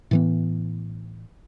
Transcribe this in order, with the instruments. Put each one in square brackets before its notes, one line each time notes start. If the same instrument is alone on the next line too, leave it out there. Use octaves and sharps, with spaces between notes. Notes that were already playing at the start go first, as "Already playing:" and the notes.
[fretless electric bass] A2 E3 B3